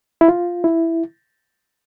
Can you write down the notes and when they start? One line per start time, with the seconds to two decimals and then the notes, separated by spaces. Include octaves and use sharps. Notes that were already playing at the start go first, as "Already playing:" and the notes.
0.21 E4
0.28 F4
0.64 E4